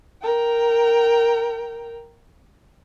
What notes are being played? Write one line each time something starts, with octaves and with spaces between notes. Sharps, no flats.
A#4 G5